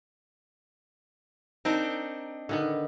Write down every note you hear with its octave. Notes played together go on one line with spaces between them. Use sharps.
C4 D4 D#4 A#4
D3 D#3 B3